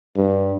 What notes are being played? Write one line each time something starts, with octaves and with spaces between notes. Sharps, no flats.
G2